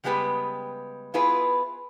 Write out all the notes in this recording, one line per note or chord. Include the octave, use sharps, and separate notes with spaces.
C#3 G3 G#3 B3 G4 B4
B3 E4 F4 G#4 B4